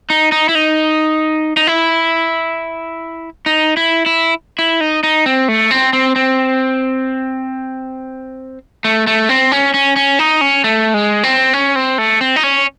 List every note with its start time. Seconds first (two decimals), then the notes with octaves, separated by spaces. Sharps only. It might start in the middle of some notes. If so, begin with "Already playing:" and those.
0.10 D#4
0.32 D#4
0.49 E4
0.55 D#4
1.57 D#4
1.67 E4
3.46 D#4
3.77 E4
4.06 E4
4.59 E4
4.81 D#4
5.03 D#4
5.26 C4
5.48 A3
5.71 C4
5.93 C4
6.16 C4
8.84 A3
9.07 A3
9.29 C4
9.52 C#4
9.74 C#4
9.96 C#4
10.19 D#4
10.41 C#4
10.64 A3
10.94 G#3
11.23 C4
11.53 C#4
11.76 C4
11.98 A3
12.21 C4
12.36 D#4
12.43 C#4